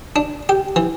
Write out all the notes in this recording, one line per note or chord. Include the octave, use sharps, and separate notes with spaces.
D4
G4
E3